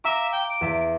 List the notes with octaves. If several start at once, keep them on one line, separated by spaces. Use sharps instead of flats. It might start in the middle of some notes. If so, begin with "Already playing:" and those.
E5 F5 A#5 D6
G5
D7
E2 E5